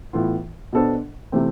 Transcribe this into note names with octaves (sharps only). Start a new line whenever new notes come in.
A2 E3 B3 F4
B2 B3 D4 A4 C5
C3 E3 A3 C4